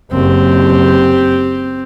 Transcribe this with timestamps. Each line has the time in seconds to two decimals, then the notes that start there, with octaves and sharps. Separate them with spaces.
0.12 F#1 C4 G4